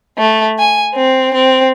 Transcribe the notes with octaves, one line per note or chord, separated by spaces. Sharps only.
A3
G#5
C4
C4